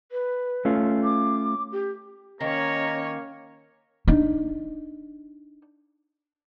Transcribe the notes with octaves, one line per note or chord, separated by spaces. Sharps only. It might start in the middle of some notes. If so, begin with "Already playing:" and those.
B4
A3 C#4 F4
D6
G4
D#3 A#3 C#4 C#5 A#5
D4 D#4